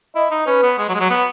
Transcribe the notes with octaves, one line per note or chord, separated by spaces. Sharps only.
E4 D#5
D#4
C#4 B4
B3
G#3
F#3
G#3
F#3
B3